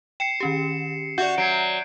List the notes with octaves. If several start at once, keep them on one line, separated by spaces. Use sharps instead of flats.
G5 C7 C#7 E7
D#3 C#4 G4
F#4 D5 E5 G6
F#3 G#6 C7 D7